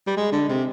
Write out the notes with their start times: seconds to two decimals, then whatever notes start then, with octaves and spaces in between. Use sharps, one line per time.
0.07 G3
0.17 G#3
0.32 D3
0.49 C3